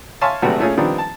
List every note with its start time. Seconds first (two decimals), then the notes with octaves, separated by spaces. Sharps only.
0.21 C#5 E5 F5 G#5 A5 C6
0.42 G#1 C3 F#3 A3 F#4 B4
0.60 A#2 A3 C#4 F4 G#4
0.77 D#3 F3 G3 B3 C4 D4
0.98 A5